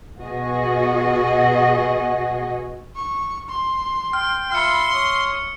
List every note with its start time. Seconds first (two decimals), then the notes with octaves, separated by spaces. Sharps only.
0.20 B2 F#4 G#4 D#5
2.96 C#6
3.49 C6
4.13 G5 F6
4.52 F4 E5 B5 C6 F6 C#7
4.94 C#5 D#6